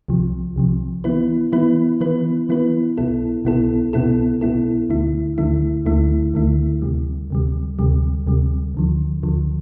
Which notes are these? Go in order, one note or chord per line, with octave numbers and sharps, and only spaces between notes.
C2 C3 F3
C2 C3 F3
E3 B3 E4 B4
E3 B3 E4 B4
E3 B3 E4 B4
E3 B3 E4 B4
C2 B2 B3 E4 A4
C2 B2 B3 E4 A4
C2 B2 B3 E4 A4
C2 B2 B3 E4 A4
D2 D3 A3 E4
D2 D3 A3 E4
D2 D3 A3 E4
D2 D3 A3 E4
D2 C3 G3
D2 C3 G3
D2 C3 G3
D2 C3 G3
D2 D3 F3
D2 D3 F3